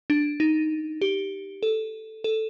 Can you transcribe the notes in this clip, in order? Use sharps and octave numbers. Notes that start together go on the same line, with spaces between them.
D4
D#4
G4
A4
A4